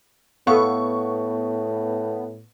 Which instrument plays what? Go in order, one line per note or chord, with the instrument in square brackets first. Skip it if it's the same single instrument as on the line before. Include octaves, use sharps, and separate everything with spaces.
[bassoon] A2 [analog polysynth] B3 [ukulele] A4 F5 [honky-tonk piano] C#6